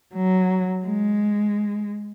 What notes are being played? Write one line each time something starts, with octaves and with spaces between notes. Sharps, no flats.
F#3
G#3